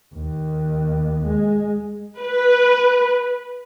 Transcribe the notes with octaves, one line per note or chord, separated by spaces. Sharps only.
D#2
G#3
B4